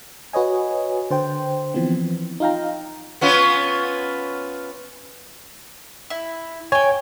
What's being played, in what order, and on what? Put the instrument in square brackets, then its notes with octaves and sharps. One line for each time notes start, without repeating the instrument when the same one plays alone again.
[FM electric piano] F#4 B4 C#5 D#5 G#5
D3 C5 G5
E3 F3 B3 C4
D#4 F4 F5 G5 A#5
[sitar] B3 C#4 F4
[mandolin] E4
[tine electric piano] C#5 [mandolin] G5 G#5